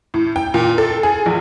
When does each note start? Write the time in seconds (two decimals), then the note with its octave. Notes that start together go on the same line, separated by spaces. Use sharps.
0.14 A2
0.36 G5
0.54 A#2
0.78 A4
1.03 G#4
1.26 A#1